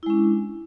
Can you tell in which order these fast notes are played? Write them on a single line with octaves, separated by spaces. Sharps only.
E4 G#3 C#4 D4